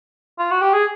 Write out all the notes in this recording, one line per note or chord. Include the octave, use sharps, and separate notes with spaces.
F4
F#4
G4
G#4